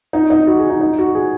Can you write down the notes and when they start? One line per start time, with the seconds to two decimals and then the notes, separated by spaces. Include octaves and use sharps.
0.13 D#4
0.30 D#4
0.47 F#4
0.58 G#4
0.70 D#4
0.81 D#4
0.98 F#4
1.15 G#4